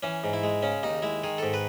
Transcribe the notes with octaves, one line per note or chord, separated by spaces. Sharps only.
E3 C#4
G#2
E4
G#3
C#3 C#4
D#2 D#4
G#3 E4
D#3 G#4
G#2 A4
B4